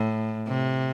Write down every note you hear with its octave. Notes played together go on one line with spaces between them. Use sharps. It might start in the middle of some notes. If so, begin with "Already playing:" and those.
Already playing: A2
C3